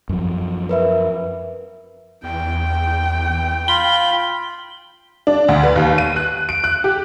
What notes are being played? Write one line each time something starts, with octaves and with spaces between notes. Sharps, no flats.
F#2 F3
A#4 B4 E5
E2 G5
F4 B5 G7
D4
D2
B4
D#2
D#7
F#6
D7
F#6
G4